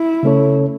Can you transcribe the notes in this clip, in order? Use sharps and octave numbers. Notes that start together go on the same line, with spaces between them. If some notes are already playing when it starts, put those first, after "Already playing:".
Already playing: E4
C#3 A3 C#4 A4 C#5